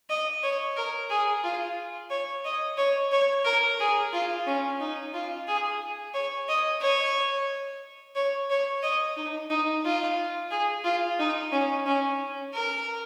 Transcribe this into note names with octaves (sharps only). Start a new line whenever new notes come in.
D#5
C#5
A#4
G#4
F4
C#5
D#5
C#5
C#5
A#4
G#4
F4
C#4
D#4
F4
G#4
C#5
D#5
C#5
C#5
C#5
D#5
D#4
D#4
F4
G#4
F4
D#4
C#4
C#4
A#4